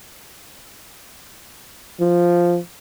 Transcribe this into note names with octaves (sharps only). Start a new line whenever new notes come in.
F3